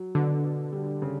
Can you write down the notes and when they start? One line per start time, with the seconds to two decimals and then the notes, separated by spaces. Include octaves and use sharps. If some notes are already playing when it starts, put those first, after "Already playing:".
Already playing: F#3
0.15 B2 D3
0.43 B2
0.72 G3
1.02 C#3